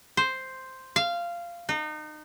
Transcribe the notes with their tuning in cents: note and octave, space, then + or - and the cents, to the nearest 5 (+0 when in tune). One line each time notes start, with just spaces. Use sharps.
C5 +0
F5 -15
D#4 -30